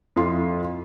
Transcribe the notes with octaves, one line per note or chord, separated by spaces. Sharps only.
F2 E4 F4 C6